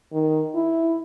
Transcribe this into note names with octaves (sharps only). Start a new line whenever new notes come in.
D#3
E4